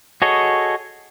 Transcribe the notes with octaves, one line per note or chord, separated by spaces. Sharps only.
F#4 G#4 A4 C#5 D#5